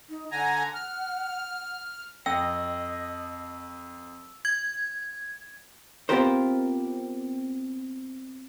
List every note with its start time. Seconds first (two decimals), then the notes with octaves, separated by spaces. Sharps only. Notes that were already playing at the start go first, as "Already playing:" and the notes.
0.09 D#4
0.32 D3 F#5 G#5 A#5
0.74 F6
2.26 F2 D#5 G5 E6
4.45 G#6
6.09 B3 C4 F4 G4 A#4 C5